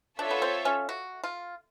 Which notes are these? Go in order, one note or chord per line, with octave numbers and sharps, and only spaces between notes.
D4 F4 A4 C#5 E5
B3
C4
C#4
F#4
F4